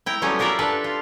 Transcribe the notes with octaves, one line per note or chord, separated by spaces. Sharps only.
E4 G5 A#5
F#3 G3 A3 B3 C#4
F4 G4 A#4 D5 E5
D4 A4 B4
F4